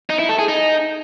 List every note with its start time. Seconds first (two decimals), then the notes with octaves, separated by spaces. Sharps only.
0.10 D#4
0.19 E4
0.29 A4
0.39 G#4
0.48 D#4